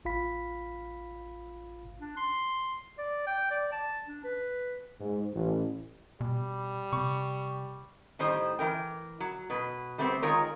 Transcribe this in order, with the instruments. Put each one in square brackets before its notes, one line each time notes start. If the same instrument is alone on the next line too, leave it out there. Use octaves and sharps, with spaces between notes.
[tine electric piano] A1 F4 F5 B5 B6
[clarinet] D4
C6
D5
G5
D5
A5
D4
B4
[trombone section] G#2
A1
[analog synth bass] B2 [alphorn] G3
[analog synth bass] C3 [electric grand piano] C#6
[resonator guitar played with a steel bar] A2 D#3 G3 C5 D#5
E3 A#4 G5
F#3
B2 B4
G3 A3 B3 C4 C5
D#3 G#3 F4 A#4 C#5